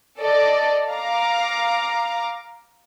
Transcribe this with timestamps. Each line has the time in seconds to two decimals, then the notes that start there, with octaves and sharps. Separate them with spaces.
0.19 A4 D5 D#5
0.91 F5 A#5 D6